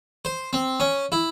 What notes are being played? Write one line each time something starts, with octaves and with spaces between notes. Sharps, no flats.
C5
C4
C#4
E4